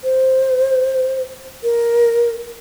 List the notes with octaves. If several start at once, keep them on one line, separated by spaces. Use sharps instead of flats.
C5
A#4